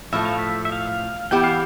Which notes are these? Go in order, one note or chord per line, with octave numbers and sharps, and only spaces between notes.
A2 F3 A3 E5
F5
E5
E5
F5
E3 B3 E4 G4 G5
F5